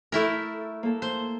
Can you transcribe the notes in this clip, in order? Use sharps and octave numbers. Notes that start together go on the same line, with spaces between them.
A3 E4 A#4
A#3 A4
C5